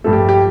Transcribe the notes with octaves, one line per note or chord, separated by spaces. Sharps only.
G2 F3 A3 A4
G4
G4